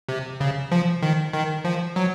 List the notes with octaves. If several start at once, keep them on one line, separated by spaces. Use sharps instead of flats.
C3
C#3
F3
D#3
D#3
F3
F#3